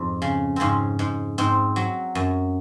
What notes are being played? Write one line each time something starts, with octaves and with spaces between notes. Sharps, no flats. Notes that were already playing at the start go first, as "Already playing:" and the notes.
Already playing: F2 G#2
C#3
G#2 C#3 C4 C#4
G#2
G#2 C4
F#3
F#2